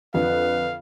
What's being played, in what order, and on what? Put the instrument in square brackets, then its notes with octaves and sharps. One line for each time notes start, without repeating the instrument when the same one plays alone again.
[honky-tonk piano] F2 D3 [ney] B4 [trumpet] F5